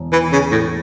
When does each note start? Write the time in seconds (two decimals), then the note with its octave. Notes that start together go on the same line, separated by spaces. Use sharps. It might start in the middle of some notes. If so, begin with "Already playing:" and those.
Already playing: E1
0.12 E3
0.32 C#3
0.51 A2